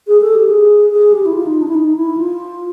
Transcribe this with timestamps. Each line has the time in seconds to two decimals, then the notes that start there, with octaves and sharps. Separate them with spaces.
0.07 G#4
0.21 A4
0.35 G4
0.49 G#4
0.91 G#4
1.12 G4
1.26 E4
1.33 F4
1.47 D#4
1.62 D4
1.68 E4
1.75 D#4
1.96 E4
2.17 F4